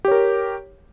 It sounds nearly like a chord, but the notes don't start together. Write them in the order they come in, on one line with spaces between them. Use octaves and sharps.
G4 C#5 A#4